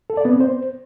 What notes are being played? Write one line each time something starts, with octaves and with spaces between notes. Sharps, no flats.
A4
D5
B3
C4
C5